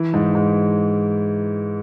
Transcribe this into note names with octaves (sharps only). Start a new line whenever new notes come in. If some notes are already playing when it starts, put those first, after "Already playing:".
Already playing: E3
G#2
G#2